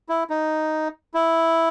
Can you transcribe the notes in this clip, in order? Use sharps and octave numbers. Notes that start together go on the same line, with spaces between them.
E4
D#4
E4